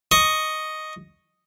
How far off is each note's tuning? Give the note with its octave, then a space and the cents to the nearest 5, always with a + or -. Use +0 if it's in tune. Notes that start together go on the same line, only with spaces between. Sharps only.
D#5 +0 C#6 +0